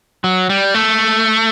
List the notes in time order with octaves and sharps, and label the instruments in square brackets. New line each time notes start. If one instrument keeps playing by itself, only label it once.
[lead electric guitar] F#3
G3
A3